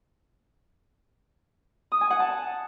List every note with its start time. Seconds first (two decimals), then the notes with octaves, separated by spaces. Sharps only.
1.92 D#6
2.01 G#5
2.10 F#5
2.20 A5